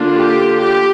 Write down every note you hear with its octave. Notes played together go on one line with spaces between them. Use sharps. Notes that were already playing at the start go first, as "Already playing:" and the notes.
Already playing: D3 A#3 D4 F4
G4
G4